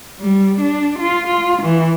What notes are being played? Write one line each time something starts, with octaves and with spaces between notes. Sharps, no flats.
G3
D4
F4
F4
E3